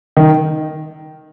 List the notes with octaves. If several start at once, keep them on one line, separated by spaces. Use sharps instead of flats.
D#3